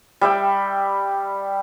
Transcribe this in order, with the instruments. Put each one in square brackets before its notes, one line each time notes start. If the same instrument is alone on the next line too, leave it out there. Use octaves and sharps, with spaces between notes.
[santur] G3 E5 G5 B5